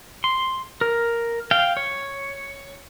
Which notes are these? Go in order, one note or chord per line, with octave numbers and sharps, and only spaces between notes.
C6
A#4
F5 G5
C#5